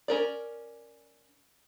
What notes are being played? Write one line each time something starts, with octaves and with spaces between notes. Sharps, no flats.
C#4 A#4 D5